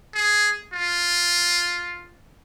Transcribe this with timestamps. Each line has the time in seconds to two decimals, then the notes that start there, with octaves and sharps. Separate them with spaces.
0.15 G#4
0.73 F4